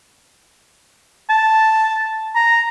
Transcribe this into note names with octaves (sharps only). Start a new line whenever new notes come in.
A5
A#5